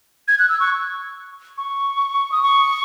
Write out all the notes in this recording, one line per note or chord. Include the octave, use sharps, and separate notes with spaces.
G#6
F#6
E6
C#6
C#6
D#6
C#6